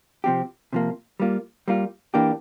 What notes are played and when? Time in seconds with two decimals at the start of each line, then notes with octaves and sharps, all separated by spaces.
0.24 C3 F3 C4 G4
0.73 C3 F3 A#3
1.20 G3 A#3 F4
1.68 G3 A#3 F4
2.14 E3 A#3 D4 G4